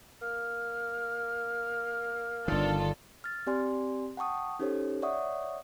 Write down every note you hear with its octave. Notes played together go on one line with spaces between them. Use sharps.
A#3 F6
G1 D#3 D4 F4 A4
F6 A6
C4 G4 D5 G#5 C6
F#5 G5 A5 C#6 D#6
C#4 D#4 G4 A4 C5 C#5
C#5 D5 E5 F#5 C#6 D#6